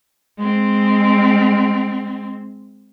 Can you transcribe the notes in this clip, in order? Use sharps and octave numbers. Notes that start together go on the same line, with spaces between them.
G#3 C4